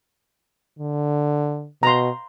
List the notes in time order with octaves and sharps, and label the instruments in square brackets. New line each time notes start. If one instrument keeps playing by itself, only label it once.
[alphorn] D3
[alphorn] B2 [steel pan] A#5 C6